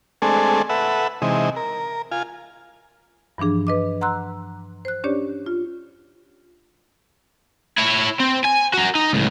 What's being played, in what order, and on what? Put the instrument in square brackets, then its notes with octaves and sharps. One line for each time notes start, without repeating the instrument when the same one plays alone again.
[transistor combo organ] G#3 A3 C4 D4 G#4 A4
A4 B4 E5 F#5
C3 E3 G#3 D#4
A#4
F4 G#5
[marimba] G2 E3 F3 D4 G#4
B4 D#5 D6
F#5 A#5 C6 E6 F#6
C5 F#6
C#4 D4 G4 C#5 D5
F4
[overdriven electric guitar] E4 C#5
C4
G#5
F#4 A#4
D#4
C#2 A2